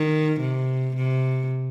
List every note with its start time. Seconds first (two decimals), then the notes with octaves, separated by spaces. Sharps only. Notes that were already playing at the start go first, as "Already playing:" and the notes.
Already playing: D#3
0.41 C3
0.96 C3